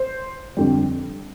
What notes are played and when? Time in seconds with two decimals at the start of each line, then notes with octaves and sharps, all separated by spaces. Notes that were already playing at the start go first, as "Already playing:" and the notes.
Already playing: C5
0.57 F2 D3 G3